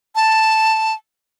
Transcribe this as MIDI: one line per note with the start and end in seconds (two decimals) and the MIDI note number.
0.15 0.93 81